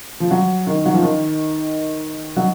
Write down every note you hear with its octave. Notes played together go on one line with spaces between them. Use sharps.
F3
F#3
D#3
F#3
F3
D#3
F#3